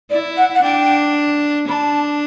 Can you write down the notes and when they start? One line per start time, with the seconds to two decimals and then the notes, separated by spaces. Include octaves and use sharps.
0.10 E4 D5
0.37 F#5
0.55 F#5
0.63 D4 G5
1.68 D4 B5
1.72 A5